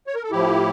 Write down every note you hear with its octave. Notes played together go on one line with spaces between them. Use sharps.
C#5
A#4
A4
A2 F3 E4 G4